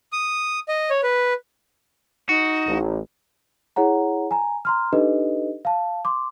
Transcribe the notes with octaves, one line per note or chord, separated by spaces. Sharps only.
D#6
D#5
C#5
B4
D#4 F#4
A1
E4 G#4 C#5 F#5 A#5
G#5 A#5
A#5 C6 F6
D4 D#4 G4 A4 B4 D#5
F5 A5
C6 D6